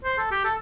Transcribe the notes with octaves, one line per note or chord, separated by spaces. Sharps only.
C5
A4
G4
A4